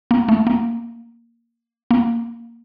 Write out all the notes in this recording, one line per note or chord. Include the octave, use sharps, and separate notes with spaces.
A#3
A3
A#3
A#3